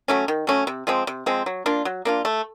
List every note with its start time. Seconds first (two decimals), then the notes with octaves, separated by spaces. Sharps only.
0.08 F#3 A3 C#4
0.28 D#3
0.47 F#3 A3 C#4
0.67 C3
0.87 F3 G#3 C4
1.07 C3
1.26 F3 G#3 C4
1.46 F#3
1.66 A#3 D4 F4
1.85 F#3
2.05 A#3 D4 F4
2.25 A3